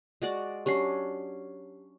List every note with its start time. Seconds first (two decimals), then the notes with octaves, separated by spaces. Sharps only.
0.22 G#3 F#4 D5
0.66 F#3 C#4 D4 G4 C7